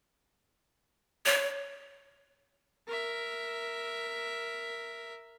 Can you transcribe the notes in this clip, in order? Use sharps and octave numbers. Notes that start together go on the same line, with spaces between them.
C#5
A#4 E5